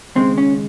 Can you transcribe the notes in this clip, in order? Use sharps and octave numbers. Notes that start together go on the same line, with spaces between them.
D#2 C#3 G#3 C4
C#4